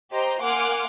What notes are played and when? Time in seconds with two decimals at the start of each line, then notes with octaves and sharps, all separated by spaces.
0.12 G4 C5 D#5 G5 A#5 C6
0.41 A#3 F#5 G#5 C6 D6 F6